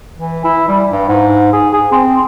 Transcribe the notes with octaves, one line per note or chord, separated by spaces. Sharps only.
E3
E4
G3
G2
G#2
G#4
G#4
C4